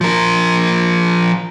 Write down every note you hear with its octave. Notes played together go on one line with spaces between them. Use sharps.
F3 A#4